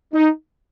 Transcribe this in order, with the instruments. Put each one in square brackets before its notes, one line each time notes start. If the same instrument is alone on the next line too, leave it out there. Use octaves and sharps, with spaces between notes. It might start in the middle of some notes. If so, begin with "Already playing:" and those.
[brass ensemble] D#4